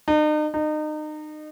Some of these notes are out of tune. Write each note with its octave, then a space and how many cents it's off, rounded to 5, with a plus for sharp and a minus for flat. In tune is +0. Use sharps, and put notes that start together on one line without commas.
D#4 -40
D#4 -30